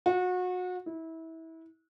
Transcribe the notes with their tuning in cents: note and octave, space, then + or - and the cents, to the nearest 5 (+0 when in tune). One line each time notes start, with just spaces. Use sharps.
F#4 -30
E4 -25